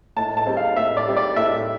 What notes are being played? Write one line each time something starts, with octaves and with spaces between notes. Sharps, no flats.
A2 A5
A5
G3 C4
F5
A2 E5
D5
G3 C4
D5
A2 E5